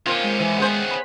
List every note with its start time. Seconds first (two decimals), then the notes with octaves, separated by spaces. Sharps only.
0.06 D#3 A#3 C4 C#4 F4 G#6
0.24 G#3
0.40 E3
0.58 B3 G#4 C5
0.91 B5